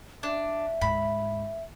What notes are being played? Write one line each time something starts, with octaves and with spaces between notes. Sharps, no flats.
D4 E5
D2 G#2 B5